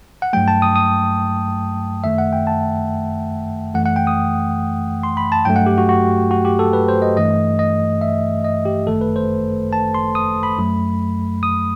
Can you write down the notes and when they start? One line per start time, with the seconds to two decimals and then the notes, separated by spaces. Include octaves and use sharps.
0.22 F#5
0.33 G2 F#3 A3 G5
0.48 A5
0.62 D#6
0.76 D#6
2.04 F#2 D#3 A3 E5
2.18 F#5
2.33 G5
2.47 A5
3.74 F#2 E3 A3 F#5
3.86 F#5
3.96 G5
4.07 D#6
5.03 C6
5.17 B5
5.32 A5
5.45 G2 F#3 A3 G5
5.56 F#5
5.66 G4
5.78 F#4
5.89 F#4
6.31 F#4
6.45 G4
6.59 A4
6.73 B4
6.88 C5
7.02 D#5
7.16 G2 E3 A3 D#5
7.59 D#5
8.01 E5
8.44 D#5
8.65 G4
8.87 G1 F#2 D#3 A3 A4
9.01 B4
9.16 C5
9.73 A5
9.94 C6
10.15 D#6
10.43 B5
10.59 F#2 F#3 A3
11.43 D#6